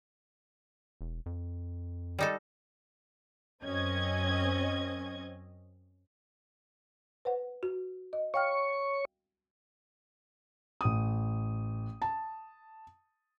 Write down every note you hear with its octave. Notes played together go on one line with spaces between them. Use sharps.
E1
F2
G3 D#4 A4
F#2 C4 C#4 D#5 G#6
B4 C5 F#5
F#4
D#5
C#5 F5 G5 C#6 F6
A1 D#6
A5